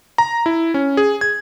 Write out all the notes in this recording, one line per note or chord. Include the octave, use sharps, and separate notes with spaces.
A#5
E4
C#4
G#4
G#6